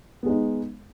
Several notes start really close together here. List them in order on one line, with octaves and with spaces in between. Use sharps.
B3 G#3 D#4